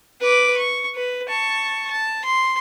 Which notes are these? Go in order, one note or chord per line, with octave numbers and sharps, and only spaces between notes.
B4 D6
C#6
B4
A5 C#6
A5
C6